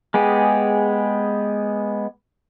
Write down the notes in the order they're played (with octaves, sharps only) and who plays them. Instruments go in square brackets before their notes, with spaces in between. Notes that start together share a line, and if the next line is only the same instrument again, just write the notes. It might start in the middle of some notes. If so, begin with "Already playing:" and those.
[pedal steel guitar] G#3 B3 G4 G#4